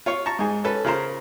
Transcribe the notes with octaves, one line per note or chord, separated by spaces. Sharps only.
F4 C#5 C#6
A5 A#5 C#6
G#2 G#4
C#4 A4 B4
C#3 F4 A#4 C5